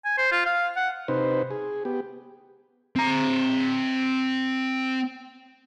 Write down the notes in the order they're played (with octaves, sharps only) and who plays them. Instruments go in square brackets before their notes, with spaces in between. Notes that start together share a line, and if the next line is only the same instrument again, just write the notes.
[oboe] G#5
C5
F4
F5
F#5
[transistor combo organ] C3 D#4 B4 C5
G#4
B3 G4
[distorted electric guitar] C4 A#5